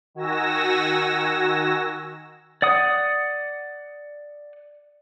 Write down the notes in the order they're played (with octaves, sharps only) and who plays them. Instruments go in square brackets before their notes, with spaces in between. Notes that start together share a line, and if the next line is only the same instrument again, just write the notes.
[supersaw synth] D#3 F#4 G#5 E6 A#6
[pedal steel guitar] D5 F#5 D#6